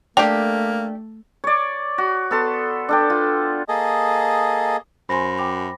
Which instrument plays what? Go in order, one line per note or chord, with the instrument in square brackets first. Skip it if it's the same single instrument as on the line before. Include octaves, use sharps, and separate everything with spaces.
[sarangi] A3 [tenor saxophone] A#3 [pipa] D4 G4 [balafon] G5
[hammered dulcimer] C#5 D5
F#4
B3 A4 C6
D4 A4 G5
F4
[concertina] A#3 G#4 A4 D#5
[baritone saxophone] F#2 [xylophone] C5 G#5 C6 [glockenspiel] B5 A#6
[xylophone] G5 D6 F7